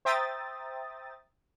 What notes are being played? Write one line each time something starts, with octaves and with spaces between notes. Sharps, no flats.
C5 E5 G5 A#5 D#6 A6